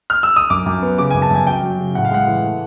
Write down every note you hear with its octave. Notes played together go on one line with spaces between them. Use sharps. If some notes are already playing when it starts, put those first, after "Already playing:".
F6
E6
D#6
F#2 D6
F#2
B3
C#3 D6
F#2 G#5
A5
F#2 G#5
F#3 G5
F#3
C#3
A2 F#5
F5
G#3 F#5
E3
A3